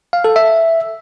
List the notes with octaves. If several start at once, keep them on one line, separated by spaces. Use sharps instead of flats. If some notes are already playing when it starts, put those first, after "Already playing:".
F5
A4
E5